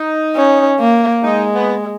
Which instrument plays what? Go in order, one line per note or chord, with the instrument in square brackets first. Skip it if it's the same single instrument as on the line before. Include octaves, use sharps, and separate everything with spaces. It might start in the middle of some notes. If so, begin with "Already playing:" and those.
Already playing: [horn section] D#4
[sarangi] C#4
A#3
[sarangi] G#3 [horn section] D#4
[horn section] B3